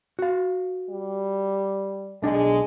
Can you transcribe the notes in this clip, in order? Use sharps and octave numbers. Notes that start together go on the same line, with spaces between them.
F#4 F5
G3
B1 G#3 D4 G#4